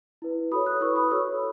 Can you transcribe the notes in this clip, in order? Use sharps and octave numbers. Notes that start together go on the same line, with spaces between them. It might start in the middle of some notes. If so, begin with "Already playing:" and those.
E4 B4
F#4 A4 C#5 B5 D#6
D#6 F#6
E4 B4 C#6 E6
B5 D#6
F#4 A4 C#5 C#6 E6